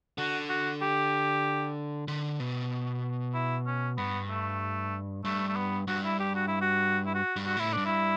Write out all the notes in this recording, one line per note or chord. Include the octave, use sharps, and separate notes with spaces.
D3 F#4
F#4
G4
D3
B2
E4
C#4
G2 B3
A3
G2 A3
A3
B3
G2 F#4
E4
G4
F#4
E4
F#4
E4
F#4
G2
F#4
A2 E4
G2 D4
E4